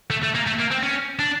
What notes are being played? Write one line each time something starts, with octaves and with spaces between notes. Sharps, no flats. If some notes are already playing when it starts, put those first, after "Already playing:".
A3
A3
A#3
A3
A#3
C4
C#4
D4